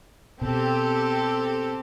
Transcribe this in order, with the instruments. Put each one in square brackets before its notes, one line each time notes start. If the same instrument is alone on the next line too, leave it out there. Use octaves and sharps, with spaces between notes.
[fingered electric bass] B2 [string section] C4 G4 A4